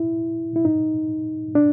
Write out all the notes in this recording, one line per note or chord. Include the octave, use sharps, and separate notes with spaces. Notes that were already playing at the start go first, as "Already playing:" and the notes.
Already playing: E4
E4
D#4
D4